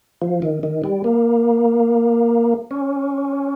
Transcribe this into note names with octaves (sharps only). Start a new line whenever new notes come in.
F3
D#3
D#3
G3
A#3
C#4